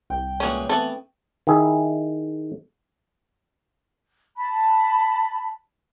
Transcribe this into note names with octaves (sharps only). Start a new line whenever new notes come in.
C2 G5
A#2 E3 G#3 C#4 F#4
E3 A3 B3 C4 A4
D#3 E4 G#4 E5
A5 B5